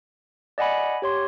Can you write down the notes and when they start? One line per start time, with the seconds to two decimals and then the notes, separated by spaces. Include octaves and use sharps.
0.58 D5 D#5 F#5 G#5 B5
1.02 G4 C#5 C6